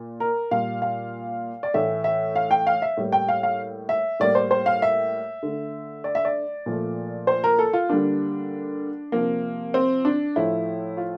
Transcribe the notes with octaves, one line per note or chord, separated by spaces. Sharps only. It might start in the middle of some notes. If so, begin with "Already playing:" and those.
Already playing: A#2
A#4
A#2 G3 A#3 F5
F5
D5
A2 E3 A3 E5
E5
F5
G5
F5
E5
A2 G3 A#3
G5
F5
F5
E5
A2 G3 A#3 D5
C5
C5
F5
E5
D3 A3
D5
E5
D5
A#2 F3 A3
C5
A#4
A4
F4
D3 G3 A#3 D4
C3 F3 A#3
C4
D4
A2 F3 A3 E4
F4